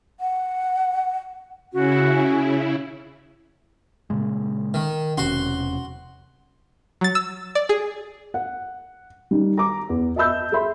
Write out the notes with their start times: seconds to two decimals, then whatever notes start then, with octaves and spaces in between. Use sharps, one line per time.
0.20 F#5
1.73 C#3 C#4 E4 F#4
4.10 A#2 C#3 G#3
4.74 D#3
5.17 E1 C3 C#4 F#4 C6
7.01 F#3 A6
7.15 E6
7.55 D5
7.69 G#4
8.34 F#5
9.31 D#3 G3
9.58 A#5 D6
9.89 E2
10.16 D#5 E5 A5 B5 E6 G6
10.52 G#4 A4 E5 B5 C6